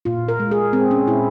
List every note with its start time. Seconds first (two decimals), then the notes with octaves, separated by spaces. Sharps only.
0.05 A#2 F4
0.28 A#4
0.40 G#3
0.51 G#4
0.73 G#3 C4
0.91 C#4
1.07 A#2 E4